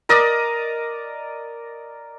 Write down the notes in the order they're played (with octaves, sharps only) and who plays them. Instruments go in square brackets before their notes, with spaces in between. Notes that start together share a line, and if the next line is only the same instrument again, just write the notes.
[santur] A#4 D5 D#5